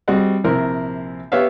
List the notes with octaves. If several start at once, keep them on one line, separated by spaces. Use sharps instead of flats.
G3 C4 F#4 G#4 D#5 F#5
A#1 C3 E4 A#4 C5
B3 G4 C#5 E5 F5